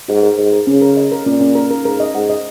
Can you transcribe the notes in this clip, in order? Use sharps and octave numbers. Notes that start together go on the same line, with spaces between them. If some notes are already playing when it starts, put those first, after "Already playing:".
G#2 F#4
A#4
G#2 A#4
A#4
C#3 C#4
A#4
D#5
A#4
A#2 C#4
C#4
A#4
A#4
G#2 A#4
D#5
G#2 F#5
D#5